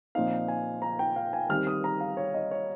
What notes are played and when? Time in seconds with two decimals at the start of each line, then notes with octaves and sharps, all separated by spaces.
0.15 A#2 F3 C4 D#4 F5
0.48 G#5
0.82 A#5
0.99 G5
1.16 F5
1.33 G#5
1.49 D#3 G3 C4 F6
1.67 D#6
1.84 A#5
2.00 F5
2.17 C#5
2.34 D#5
2.51 C#5